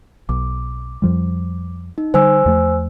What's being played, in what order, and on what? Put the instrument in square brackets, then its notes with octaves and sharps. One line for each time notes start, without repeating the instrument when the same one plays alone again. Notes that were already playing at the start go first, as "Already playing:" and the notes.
[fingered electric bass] B1 [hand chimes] D6
[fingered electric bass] F2 F3 G3
[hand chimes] D#4
[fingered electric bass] D3 G3 [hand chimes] C5 G#5 E6
[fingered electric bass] E2 F3 A3